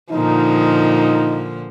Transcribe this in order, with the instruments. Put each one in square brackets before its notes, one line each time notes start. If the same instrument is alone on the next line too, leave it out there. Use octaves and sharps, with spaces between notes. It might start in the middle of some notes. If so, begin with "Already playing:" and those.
[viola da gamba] A#2 D3 F3 [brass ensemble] D#4